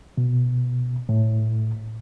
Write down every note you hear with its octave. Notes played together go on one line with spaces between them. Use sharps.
B2
A2